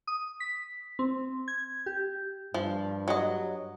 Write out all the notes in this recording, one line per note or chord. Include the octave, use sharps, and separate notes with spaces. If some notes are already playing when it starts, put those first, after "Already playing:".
D#6
B6
C4
G#6
G4
G2 F3
F#3 D#5